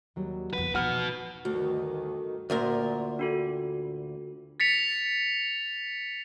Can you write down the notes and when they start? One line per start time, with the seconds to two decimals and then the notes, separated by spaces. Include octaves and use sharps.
0.16 D#2 F#3 G3
0.53 F#1 E2 F3 B4 F#5
0.75 E3 F3 B3 D#4 F#4 B4 F#5 F6
1.45 D2 G2 D#3 F#4
2.50 D2 A#2 A#4
3.19 D4 F#4 A4
4.60 A6 B6 C#7 F7